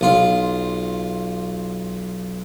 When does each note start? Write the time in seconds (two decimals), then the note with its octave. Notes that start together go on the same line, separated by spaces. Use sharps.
0.01 B1 F4